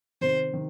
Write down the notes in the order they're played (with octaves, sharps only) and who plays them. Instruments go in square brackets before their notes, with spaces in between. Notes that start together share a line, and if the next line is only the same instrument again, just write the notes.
[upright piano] C3 D#3 [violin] C5
[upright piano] D#3